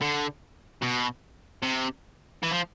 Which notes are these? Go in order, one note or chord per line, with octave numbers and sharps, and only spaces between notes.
D3
B2
C3
E3
F3